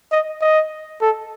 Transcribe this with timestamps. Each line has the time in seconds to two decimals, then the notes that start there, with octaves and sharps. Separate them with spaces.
0.12 D#5
0.42 D#5
1.01 A4